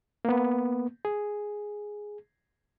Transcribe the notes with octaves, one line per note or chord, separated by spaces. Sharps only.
A#3 B3
G#4